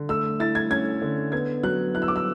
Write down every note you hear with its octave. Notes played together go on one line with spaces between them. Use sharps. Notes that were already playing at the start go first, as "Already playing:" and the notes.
Already playing: D3
A3 E6
E4 A6
G#6
C#4 G#6
D3
B3 G#6
F#3 F#6
E4 F#6
E6
D6
E6